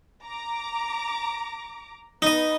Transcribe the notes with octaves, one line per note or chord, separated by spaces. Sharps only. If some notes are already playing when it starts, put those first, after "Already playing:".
A#5 D6
B3 D#4 B4 D#5